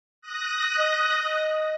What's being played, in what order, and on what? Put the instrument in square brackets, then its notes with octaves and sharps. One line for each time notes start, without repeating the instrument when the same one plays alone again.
[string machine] D#6 F#6 A#6
[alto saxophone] D#5